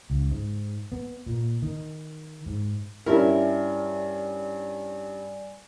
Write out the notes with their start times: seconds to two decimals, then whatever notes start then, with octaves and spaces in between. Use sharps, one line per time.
0.10 C#2
0.31 G#2
0.92 B3
1.26 A#2
1.62 D#3
2.46 G#2
3.06 G2 G3 C#4 E4 A#4 D5 G#5